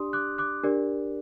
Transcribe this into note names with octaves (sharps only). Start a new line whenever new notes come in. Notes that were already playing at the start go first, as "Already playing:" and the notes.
Already playing: D4 G4 D5 C6 D#6
D6 F#6
D6 F#6
D4 G4 A#4 D5